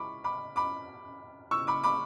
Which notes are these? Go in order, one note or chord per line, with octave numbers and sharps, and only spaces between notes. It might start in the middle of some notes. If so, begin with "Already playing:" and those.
Already playing: G#3 E4 B5 C#6 D6
B5 D6
B5 D6
C#6 E6
B5 D6
B5 D6